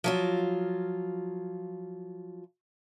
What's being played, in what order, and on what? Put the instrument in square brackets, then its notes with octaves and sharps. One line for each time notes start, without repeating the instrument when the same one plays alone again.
[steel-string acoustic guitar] F3 F#3 F4